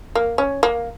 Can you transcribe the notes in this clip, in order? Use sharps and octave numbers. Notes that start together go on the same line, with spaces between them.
A#3
C#4
A#3